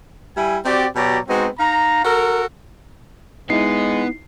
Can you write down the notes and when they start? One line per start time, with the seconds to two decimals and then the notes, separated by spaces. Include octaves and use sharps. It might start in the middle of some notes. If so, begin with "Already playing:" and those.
0.35 G3 E4 G#5
0.65 C4 F#4 G4 D5
0.95 B2 F#3 G4 D5 A#5
1.28 G#3 B3 C4 D#4 F#4
1.59 D#4 F5 A#5
2.04 F#4 A4 A#4
3.50 G#3 B3 D#4 E4 C7